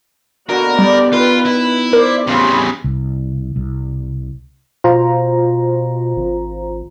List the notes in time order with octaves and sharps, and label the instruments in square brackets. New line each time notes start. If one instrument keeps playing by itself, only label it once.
[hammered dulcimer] B2 D3 [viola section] A#3 F#4 [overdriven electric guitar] A#4
[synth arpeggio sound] G3 [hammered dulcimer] B3 [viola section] G4 D5
[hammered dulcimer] D#3 [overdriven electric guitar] F4 [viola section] B4
[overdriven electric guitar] E4
[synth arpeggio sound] A#4 [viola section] C5 D5
[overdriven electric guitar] E2 C#3 [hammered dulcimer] C4 F4 [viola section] G4 B5
[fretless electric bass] C2
C2
[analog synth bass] B2 [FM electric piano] F4 C5 A#5
[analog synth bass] G#1